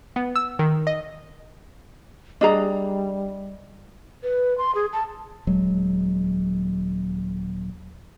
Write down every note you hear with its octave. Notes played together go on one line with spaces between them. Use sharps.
B3
E6
D#3
D#5
G3 D4 G#4 D#5 A#5
B4
C6
G#4
A5
D#1 F#3 G#3